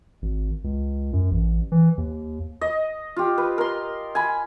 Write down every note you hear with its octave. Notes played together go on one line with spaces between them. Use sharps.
G#1
C#2
F#2
A1
E3
D#2
D#5
F4 G4
B4
A#4 C6
G#5 B5